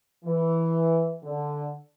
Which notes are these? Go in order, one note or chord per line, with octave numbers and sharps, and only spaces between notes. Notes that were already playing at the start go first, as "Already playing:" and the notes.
E3
D3